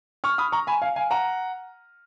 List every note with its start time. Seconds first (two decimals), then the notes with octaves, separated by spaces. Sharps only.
0.24 C#6 F6
0.38 B5 D#6
0.52 A#5 C#6
0.67 G#5 B5
0.81 F5 G#5
0.96 F5 G#5
1.11 F#5 A#5